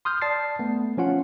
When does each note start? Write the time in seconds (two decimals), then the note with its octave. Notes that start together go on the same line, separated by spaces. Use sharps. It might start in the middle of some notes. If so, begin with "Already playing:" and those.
0.05 C6 D#6 F6 G6
0.22 D5 A5 A6 C7
0.59 A3 B3
0.97 F3 C#4 F4 F#5